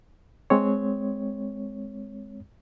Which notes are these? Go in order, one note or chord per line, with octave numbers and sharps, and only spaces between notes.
G#3 C4 C#5